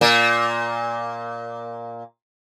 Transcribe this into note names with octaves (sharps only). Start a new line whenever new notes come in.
A#2 A#3